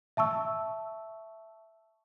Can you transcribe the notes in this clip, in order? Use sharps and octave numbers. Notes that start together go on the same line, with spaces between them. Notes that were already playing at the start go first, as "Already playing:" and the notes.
E5 A5 C#6 E6